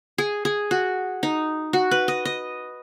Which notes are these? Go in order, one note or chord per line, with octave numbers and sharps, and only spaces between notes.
G#4
G#4
F#4
D#4
F#4
B4
D#5
D#5